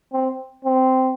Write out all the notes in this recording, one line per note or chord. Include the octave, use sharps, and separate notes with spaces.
C4
C4